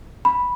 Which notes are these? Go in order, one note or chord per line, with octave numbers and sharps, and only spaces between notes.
B5